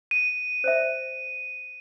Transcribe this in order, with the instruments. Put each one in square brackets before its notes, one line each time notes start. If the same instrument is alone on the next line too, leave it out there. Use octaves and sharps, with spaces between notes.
[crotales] D#7
[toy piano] C5 D5 E5